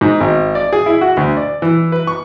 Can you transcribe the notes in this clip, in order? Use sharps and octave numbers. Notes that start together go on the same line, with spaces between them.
G#2
G#1
D5
G#4
E4
F#4
D2
D5
E3
B4
C#6